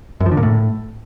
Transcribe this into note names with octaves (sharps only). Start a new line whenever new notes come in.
F#2
F3
D3
A#2
A2